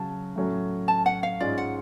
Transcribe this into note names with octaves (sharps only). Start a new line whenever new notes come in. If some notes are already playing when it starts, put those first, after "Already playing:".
Already playing: C#3 F#3 C#4 A5
A2 F#3 A3 C#4
A5
F#5
F5
G#2 G#3 C#4 F4 D5
F#5